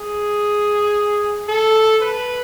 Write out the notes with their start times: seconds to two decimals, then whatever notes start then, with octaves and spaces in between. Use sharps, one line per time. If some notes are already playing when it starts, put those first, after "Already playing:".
Already playing: G#4
1.48 A4
2.01 B4